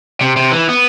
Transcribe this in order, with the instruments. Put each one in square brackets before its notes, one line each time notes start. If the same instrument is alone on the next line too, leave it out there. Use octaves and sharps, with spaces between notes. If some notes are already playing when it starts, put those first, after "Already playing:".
[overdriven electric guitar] C3
C3
E3
B3